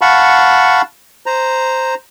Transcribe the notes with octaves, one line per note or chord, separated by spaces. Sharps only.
F5 F#5 A5 B5 C#6
C5 A#5